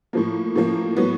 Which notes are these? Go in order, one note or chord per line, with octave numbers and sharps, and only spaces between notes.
A2 F3 A#3
A2 F3 A#3
A2 F#3 B3